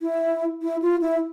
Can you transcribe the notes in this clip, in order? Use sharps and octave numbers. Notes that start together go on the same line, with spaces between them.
E4
E4
F4
E4